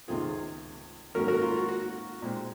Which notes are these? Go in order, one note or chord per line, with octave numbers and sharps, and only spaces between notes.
C#2 C3 D#3 G#3 C4 F4 G#4
G#2 D#3 F#3 A#3 C#4 F#4 A#4
F#4 A#4
F4
F#4
F#4
A#2 G#3 C4